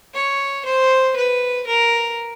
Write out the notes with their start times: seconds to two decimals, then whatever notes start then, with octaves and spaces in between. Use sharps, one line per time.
0.15 C#5
0.66 C5
1.16 B4
1.67 A#4